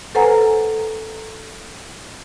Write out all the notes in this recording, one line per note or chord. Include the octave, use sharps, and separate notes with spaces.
A4 B4 C5 F#5 G#5 A#5